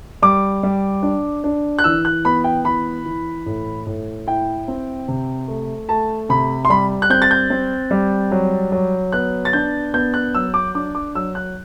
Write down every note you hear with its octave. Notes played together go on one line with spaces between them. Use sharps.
G3 D6
G3
D4
D4
F#6
E3 E6
F#6
B3 B5
G5
E3 B5
E3
A2
A2
E4 G5
C4
C3
A3
A3 A5
C3 B5
C6
G3 B5
F#6
C4 G6
A6
G6
C4
G3
F#3
F#3
B3 F#6
A6
D4 G6
B3 G6
F#6
F#3 E6
D6
D4 D6
D6
F#3 E6
F#6